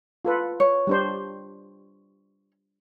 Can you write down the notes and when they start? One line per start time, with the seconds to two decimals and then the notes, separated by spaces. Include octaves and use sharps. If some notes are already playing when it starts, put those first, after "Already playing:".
0.25 F4 A4 B4
0.60 C#5
0.87 G3 D4 C5